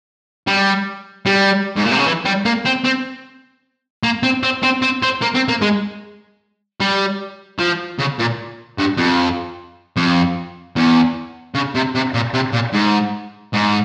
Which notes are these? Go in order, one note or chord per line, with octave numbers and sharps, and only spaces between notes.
G3
G3
G#2
A#2
C3
C#3
E3
G3
A#3
C4
C4
A#3
C4
C4
C4
C4
C4
A#3
C4
A#3
G#3
G3
F3
C#3
A#2
G2
F2
F2
E2
C#3
C3
C3
A#2
C3
A#2
G#2
G#2